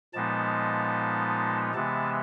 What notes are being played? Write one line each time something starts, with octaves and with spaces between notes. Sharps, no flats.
A#2 F3 G#3 B3 D#4 A5
C3 E3 G#3 B3 A5